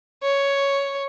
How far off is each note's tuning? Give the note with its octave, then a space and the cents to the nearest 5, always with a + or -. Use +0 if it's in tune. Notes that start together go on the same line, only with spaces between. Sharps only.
C#5 +5